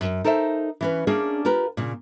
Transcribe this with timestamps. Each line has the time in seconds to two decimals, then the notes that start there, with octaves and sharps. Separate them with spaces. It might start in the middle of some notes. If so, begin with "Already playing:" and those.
0.01 F#2
0.24 D#4 A4 A#4 C5 E5
0.81 E3 C#4 B4
1.07 A#3 C#4 D4 G#4
1.45 F4 G4 A#4 B4
1.77 A#2 C#3